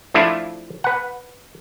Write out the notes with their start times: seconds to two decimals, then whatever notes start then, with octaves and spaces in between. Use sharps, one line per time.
0.14 F3 A3 D4 E4 F4
0.84 B4 F#5